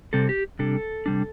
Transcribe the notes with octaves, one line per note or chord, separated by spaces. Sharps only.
C3 G3 C4 A4
G4
C3 G3 D4 A4
C3 G3 D4